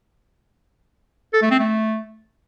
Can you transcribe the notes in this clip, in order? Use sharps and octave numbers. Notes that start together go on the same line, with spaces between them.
A4
A3
C4
A3